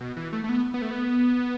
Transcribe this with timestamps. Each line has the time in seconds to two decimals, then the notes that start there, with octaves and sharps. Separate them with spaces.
0.01 B2
0.17 E3
0.33 A3
0.44 A3
0.49 B3
0.74 B3
0.82 A3
0.91 B3